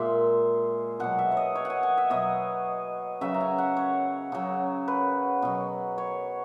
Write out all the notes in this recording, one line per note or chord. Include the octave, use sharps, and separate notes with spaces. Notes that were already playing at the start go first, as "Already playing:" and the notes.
Already playing: A#2 G#3 E5
B2 F#3 F#5
E5
C#5
D#5
C#5
F#5 G#5
G#5
E5
B2 F#3 D#5
C#3 F#3 E5
A#5
G#5
F#5
C#5
C#3 F#3
B4
B2 F#3
C#5